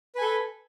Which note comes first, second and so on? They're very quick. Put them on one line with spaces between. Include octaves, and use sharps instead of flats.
B4 G#5 A4